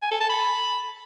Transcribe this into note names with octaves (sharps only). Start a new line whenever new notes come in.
G#5
A4
A5
B5